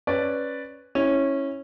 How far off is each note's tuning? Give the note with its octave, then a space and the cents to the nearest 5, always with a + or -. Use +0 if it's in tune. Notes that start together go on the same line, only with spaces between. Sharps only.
C#4 -5 B4 +0 D5 +0
C#4 -15 E4 -15